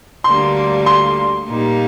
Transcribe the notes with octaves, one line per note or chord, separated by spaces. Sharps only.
D2 D3 G3 A#3 D4 C6
C6
A#2 G3 A#3 D#4